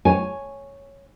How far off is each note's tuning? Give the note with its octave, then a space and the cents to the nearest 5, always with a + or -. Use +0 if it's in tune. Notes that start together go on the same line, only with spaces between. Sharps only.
C#5 +0 G#5 +0